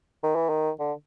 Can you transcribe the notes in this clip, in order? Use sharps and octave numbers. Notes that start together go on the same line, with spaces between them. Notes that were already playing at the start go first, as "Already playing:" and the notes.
D#3
E3
D#3
D3